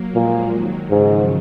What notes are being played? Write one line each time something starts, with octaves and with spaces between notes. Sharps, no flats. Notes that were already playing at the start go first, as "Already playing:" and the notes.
Already playing: F#3 A#3
A#2 F3 G#3
D#3 F#3
G#2 C#3 F3